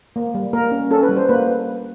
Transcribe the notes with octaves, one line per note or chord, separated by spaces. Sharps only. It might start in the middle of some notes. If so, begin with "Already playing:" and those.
A#3
G3
A#3 A#4
C#4
C#4 A4
B4
G3
C5
A#3 B4